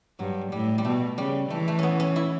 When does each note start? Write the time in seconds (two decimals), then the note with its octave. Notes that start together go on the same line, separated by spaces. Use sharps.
0.19 G2 F#3
0.52 A2 G3
0.78 G3
0.85 B2 A3
1.18 C#3 G3
1.50 E3 A3
1.68 A3
1.79 B3 C#4
2.00 C#4
2.16 E4